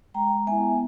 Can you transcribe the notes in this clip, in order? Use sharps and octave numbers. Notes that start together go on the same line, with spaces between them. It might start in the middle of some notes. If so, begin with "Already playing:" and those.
G#3 G5 A#5
B3 E4 E5 G#5